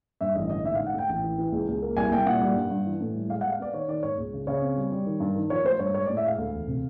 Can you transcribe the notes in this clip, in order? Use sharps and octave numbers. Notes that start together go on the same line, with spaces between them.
G2 E5
A1 D#5
D3 D#5
G#2 E5
F5
G#2
F#5
A3 G5
A1 G5
E3
E3
C#2
C#2
A#3
C2 G#5
C2 G5
A#2 F#5
G3
G2
G2
E3
A2
G3
G#3 F5
F#5
G#3
F5
B3 D5
D#3 C#5
D#3 D5
G#2 C#5
C#2
C#3
C#3 C#5
C4
G3
G3
D#3
G2
D#3
F3 C#5
A3 C5
G2 C#5
G#3 C#5
D5
A2
E5
G#3 F5
D2
E1
C3